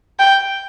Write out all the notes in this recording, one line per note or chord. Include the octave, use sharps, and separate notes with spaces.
G5